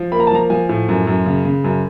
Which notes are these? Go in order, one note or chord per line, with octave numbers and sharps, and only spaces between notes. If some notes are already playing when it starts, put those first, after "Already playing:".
Already playing: F3
A#3 B5
A#5
A5
F3 A#5
F3 G#5
A2
F#2
F#2
C#3
C#3
F#2